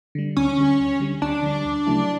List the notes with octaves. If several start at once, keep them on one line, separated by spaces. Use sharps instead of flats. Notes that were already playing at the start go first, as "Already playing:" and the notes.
D3 G3
D2 C#4
D3 G3
D2
D3 G3
D2 D4
D3 G3
D2
C#3 F#3 A3 E4